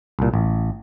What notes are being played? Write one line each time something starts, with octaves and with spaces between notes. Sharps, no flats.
C2 A#2
A1